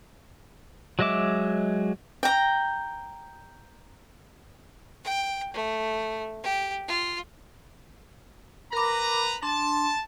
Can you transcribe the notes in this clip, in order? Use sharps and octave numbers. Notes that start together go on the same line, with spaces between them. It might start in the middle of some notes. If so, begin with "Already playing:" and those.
F#3 G#3 D#5 E5 D6
G5 A#5
G5
A3
G4
F4
A#4 B4 A#5 B5 D6
D4 A5 C6